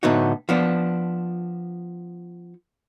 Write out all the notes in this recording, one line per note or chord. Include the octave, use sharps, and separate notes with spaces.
A2 D3 B3 D#4 F#4
F3 B3 D4